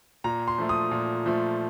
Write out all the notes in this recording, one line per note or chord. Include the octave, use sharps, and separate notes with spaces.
A#2 A#5
C6
F3 A3
D#6
A#2
F3 A3